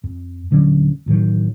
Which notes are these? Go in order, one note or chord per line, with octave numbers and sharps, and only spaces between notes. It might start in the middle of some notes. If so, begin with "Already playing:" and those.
F2
D#1 D3 F#3 C#4
A1 A2 D#3 F#3